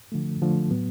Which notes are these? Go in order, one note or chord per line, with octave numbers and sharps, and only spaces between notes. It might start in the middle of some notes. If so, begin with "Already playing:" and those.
D3 F3 A3
D3 F3 A3
A2 F#3 B3